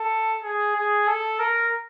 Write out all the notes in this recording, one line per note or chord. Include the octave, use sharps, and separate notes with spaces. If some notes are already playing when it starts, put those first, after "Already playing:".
Already playing: A4
G#4
G#4
A4
A#4